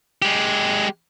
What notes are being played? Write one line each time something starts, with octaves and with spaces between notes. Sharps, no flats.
G#3 G4